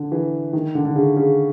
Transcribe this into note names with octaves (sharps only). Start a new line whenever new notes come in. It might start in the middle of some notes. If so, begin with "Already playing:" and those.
Already playing: D3
E3
D#3
D3
D3
C#3
C#3